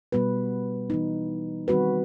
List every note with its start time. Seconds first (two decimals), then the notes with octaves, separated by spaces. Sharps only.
0.12 B2 G3 B3 F#4 B4
0.90 E3 B3 D#4
1.68 D#3 G3 C4 F#4 B4